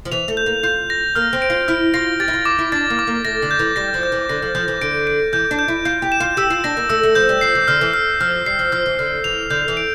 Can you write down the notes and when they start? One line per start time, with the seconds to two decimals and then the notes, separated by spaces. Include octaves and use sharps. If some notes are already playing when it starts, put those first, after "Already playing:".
0.05 F3
0.12 E3 F7
0.28 A3
0.37 G6
0.46 A#3
0.63 F4 G6
0.90 A#6
1.15 A#3 F6
1.33 C4
1.42 D7
1.50 F4
1.68 E4 F6
1.94 F4 A#6
2.20 G4 A6
2.28 E4
2.33 F4
2.45 F4 D6
2.59 E4
2.72 D4 A6
2.90 A#3
2.99 D6
3.07 A#3
3.25 A3 A#6
3.42 D3
3.51 G6
3.59 E3
3.76 G3 A#6
3.94 F3
4.03 G6
4.12 E3
4.29 D3 A#6
4.42 F3
4.55 F3 G6
4.68 E3
4.81 D3 D7
5.07 D7
5.33 E3 G6
5.51 D4
5.59 G6
5.68 E4
5.85 F4 G6
6.02 G4
6.12 E7
6.20 F4
6.37 G4 E6
6.50 F4
6.64 D4 A#6
6.77 A#3
6.90 A3 E6
7.03 A3
7.15 F3 G6
7.29 G3
7.41 F3 C7
7.55 E3
7.68 D3 F6
7.81 E3
7.94 F6
8.20 F3 F6
8.46 G3 C7
8.59 F3
8.72 F3 F6
8.86 E3
8.99 D3 F6
9.24 E3 F7
9.50 D3 G6
9.68 E3
9.77 D7